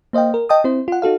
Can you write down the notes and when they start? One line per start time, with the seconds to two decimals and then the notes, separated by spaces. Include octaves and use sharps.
0.13 A#3 C5 D#5 F5 G5
0.34 A#4
0.49 D#5 G5 A5 D#6
0.64 C4 E4 C5
0.88 F4 F#5
1.02 D#4 F#4 A4 F5